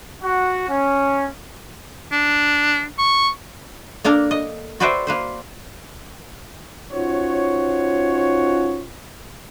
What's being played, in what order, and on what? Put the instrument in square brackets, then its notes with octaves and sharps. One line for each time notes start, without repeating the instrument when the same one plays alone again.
[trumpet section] F#4
C#4
[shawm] D4
C#6
[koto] A#3 D4 A4 A#4
D#5
F#4 B4 C5 D5 E5 G5
A#3 B4 C5
[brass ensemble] C#4 D#4 F4 F#4 C5 C#5